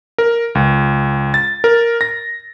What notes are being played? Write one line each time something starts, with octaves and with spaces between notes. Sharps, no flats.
A#4
C#2
A6
A#4
A#6